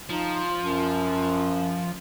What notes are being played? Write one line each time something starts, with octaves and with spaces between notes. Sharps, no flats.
F3 D#4
F#2